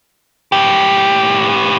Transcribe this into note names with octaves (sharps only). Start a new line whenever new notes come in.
A2 G4